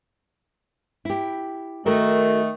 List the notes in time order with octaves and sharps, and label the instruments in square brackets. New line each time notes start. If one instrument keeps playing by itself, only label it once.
[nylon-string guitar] E4 G4
[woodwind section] D#3 A3 [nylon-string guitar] F#4 A4 A#4